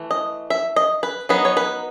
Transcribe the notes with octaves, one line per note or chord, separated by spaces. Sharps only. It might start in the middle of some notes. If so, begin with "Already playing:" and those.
Already playing: E3 A3
D#5
E5
D#5
B4
F#3 B3 D#4 B4
C#5
B4